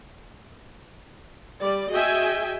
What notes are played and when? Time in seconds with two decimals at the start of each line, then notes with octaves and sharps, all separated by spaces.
1.61 G3 D5
1.91 F#4 G#4 D#5 E5 G5 G#5